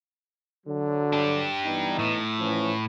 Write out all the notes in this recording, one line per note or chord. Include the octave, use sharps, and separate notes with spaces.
D3 F#3
D4 G4
E3 B3 D#4
A2
E3 F3 C#4